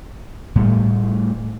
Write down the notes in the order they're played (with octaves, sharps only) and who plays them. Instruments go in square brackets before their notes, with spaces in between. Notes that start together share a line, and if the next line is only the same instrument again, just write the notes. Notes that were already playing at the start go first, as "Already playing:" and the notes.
[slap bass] A2 G3 A3